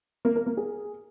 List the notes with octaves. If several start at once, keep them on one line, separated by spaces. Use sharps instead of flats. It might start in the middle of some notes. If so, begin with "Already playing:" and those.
A#3
A#4
A#3
G#4